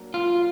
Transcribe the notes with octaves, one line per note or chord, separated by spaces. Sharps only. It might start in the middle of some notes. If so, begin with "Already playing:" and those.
Already playing: F#3 A#3 D4
F4